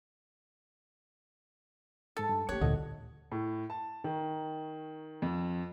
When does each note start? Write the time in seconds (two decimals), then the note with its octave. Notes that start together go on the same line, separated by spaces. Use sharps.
2.17 G#2 A4 A6
2.29 G2
2.49 A#3 C#4 G4 C#5 F#6
2.61 D2 A#2 A#3 A4 D#5 F#5
3.32 A2
3.70 A5
4.04 D#3
5.22 F2